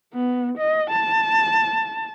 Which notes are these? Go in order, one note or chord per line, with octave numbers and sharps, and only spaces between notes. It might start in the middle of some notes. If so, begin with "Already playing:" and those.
B3
D#5
A5